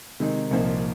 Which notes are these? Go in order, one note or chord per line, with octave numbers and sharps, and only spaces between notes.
C3 D#3 G#3 D#4
C2 A#2 F3 C4 D#4